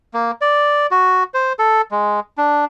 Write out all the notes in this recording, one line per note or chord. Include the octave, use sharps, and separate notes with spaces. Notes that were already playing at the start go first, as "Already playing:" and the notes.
A#3
D5
F#4
C5
A4
G#3
D4